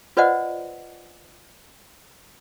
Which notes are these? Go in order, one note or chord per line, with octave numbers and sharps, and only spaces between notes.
F4 B4 C5 D5 D#5 F#5